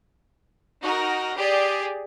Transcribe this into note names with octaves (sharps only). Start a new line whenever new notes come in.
D#4 F#4 A#4
G4 G#4 D5